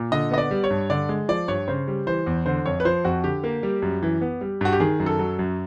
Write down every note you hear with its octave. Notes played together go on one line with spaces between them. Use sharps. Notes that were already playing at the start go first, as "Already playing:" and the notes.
Already playing: A#2
D3 D#5
B3 D#5
D5
G3
C#5
G2
D3 D5
G#3
F3 D5
G2 C#5
C#3 C5
G3
E3 C5
E2
D3 C5
F2 C#5
B4
F3 C5
F2 F#4
D3 G4
A#3
G3
F#2
E3
B3
G3
G2 F#4
G4
D#3 G#4
F#2
A4
F#3
F#2